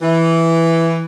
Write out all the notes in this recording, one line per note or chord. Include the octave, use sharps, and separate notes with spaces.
E3